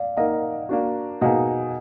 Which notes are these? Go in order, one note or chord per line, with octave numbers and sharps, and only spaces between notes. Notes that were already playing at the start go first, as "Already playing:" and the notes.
Already playing: D5 F5
A#3 D#4 A#4 D#5 F#5
A#3 D4 F#4
B2 A#3 D#4 G#4 D#5 F#5